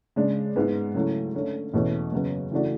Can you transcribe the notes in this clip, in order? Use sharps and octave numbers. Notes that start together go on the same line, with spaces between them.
C#3 G#3 D4
G#2 G#3 B3
C#3 F#3 A3 E4
D3 A3 C#4
E2 B2 A3 C#4 E4
F#2 C#3 F#3 B3
C#3 E3 A3 D4 F#4